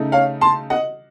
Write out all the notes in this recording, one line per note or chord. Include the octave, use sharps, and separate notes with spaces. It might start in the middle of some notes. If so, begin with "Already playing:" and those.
Already playing: C#3 A3 D#4
C#5 F5
A5 C6
D#5 F#5